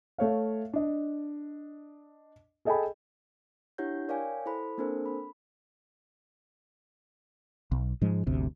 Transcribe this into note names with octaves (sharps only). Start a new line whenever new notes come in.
A3 C#5 F5
D4 D#5
G#4 A4 D#5 G5 G#5 B5
D4 E4 G4 C#5 F#5 G6
A#4 C#5 D5 F5 G5 G#5
E4 A4 C5 B5
A#3 C4 D4 A4 A#4 C5
B5
B1
G#2 F3 G#3
G1 D2 C3